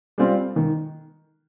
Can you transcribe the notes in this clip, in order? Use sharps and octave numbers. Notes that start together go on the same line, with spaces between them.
G3 C4 F4
D#3